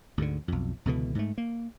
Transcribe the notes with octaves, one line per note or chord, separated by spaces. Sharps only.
D2 G#2 D3
B1 F2
C#2 B2 D3 E3
G#2 A3
A#3